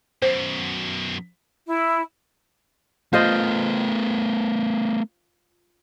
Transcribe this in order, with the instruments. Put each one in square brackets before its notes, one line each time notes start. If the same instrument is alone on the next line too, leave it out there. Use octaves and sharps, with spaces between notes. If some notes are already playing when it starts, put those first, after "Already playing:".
[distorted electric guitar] F#2 B2 [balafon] C5
[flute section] E4
[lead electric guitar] A3 B3 [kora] F4 C5 D#5